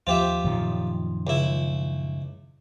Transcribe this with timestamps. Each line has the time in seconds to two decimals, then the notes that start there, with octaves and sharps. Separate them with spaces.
0.07 D#2 F3 F4 G4 C5 E5
0.44 F#2 A#2 D#3 F3
1.27 C#2 E4